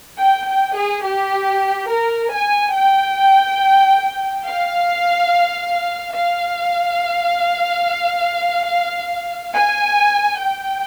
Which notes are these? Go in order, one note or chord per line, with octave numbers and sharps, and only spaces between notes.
G5
G5
G#4
G4
A#4
G#5
G5
F5
F5
G#5
G5